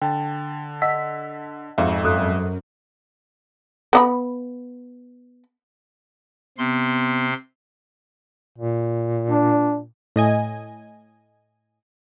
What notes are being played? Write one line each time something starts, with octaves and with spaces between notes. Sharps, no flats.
D3 G5 A5
D#5 F#5 E6 B6
F2 G#2 F#4 E5 F5
F#2 A4 D#6 F#6
B3 D#5 B5
C3 B3 C6
A#2
D4
A2 D#5 G#5